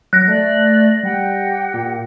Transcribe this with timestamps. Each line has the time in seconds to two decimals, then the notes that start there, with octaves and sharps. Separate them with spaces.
0.13 F#3 F#6 A#6
0.28 A3 D5
1.03 G3 G4 F#5 G5
1.74 A#2